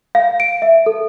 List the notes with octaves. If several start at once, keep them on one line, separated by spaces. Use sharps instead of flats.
F5
D7
E5
A4